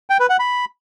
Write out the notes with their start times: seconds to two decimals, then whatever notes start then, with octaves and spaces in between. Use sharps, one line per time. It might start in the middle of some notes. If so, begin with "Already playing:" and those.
0.10 G5
0.20 B4
0.29 F#5
0.39 B5